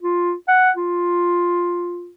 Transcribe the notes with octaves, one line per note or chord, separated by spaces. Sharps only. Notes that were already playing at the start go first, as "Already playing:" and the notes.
F4
F#5
F4